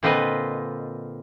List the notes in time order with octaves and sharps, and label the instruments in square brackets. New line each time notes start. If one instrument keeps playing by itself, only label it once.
[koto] A#2 D3 C4 F4 B4 D#5